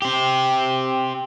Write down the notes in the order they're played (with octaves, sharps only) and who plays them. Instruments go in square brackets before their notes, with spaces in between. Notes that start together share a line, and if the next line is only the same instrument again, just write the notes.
[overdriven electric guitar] C4 G4